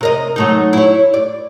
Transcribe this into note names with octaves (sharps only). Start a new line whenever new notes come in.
C3 A#4 D#5
F#3 A3 D#4
E4 C#5
D5